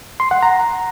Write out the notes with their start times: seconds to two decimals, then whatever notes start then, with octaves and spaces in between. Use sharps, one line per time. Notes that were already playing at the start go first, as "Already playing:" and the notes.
0.20 C6
0.31 F#5
0.43 A#5